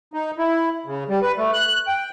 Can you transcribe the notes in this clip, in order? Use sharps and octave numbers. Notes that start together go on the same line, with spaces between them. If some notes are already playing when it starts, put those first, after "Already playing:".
D#4
E4
C#3
G3
B4
A3
F#6
G5